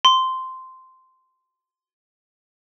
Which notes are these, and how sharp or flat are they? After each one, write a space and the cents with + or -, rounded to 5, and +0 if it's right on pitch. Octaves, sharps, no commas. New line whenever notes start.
C6 -10